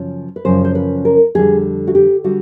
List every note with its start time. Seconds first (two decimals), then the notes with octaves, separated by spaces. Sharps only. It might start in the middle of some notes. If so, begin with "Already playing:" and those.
Already playing: F#2 C#3 F3
0.36 B4
0.45 F#2 C#3 F3 C5
0.65 C5
0.75 B4
1.05 A#4
1.35 F2 D3 G3 G#4
1.87 F#4
1.95 G4
2.24 D3 G3 F#4